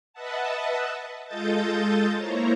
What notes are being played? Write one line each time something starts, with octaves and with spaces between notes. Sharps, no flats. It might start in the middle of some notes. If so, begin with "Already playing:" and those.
B4 D#5 E5 F#5 A5
G#3 F4 A4 D#5 G6 A6
A#3 E4 C5 C#5 A#5